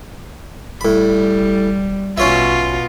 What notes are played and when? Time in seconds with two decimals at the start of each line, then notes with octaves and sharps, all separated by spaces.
0.81 E1 A2 G3 B5
2.18 A#1 B2 C#4 F4 C#5 E5